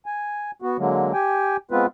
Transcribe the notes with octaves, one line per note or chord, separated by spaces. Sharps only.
G#5
B3 F#4
D3 F#3 G#3 A#3
G4 G5 G#5
G#3 B3 C4 F4 B4